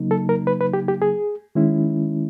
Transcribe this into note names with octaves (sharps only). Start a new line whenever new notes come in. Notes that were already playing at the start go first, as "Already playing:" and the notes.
Already playing: C#3 F#3 A#3 D#4
A4
A#4
B4
B4
G4
G4
G#4
D#3 G#3 C#4 E4